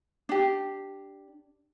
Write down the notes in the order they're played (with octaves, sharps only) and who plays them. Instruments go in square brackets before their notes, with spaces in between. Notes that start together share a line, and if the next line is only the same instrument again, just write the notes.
[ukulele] D4 G4